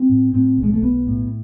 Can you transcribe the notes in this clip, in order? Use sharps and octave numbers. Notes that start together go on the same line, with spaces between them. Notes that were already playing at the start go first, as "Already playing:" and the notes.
Already playing: C4
A2
A2 C4
B1
G#3
A3
B1 B3
A2